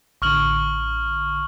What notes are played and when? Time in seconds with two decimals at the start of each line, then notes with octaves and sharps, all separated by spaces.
0.22 A1 D3 C#6 F6 F#7